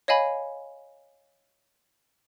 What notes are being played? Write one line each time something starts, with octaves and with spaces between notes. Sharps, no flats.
C#5 D#5 F5 G#5 B5